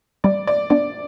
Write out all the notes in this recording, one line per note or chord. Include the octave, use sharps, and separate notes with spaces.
G3 D5
D5
B3 D4 D5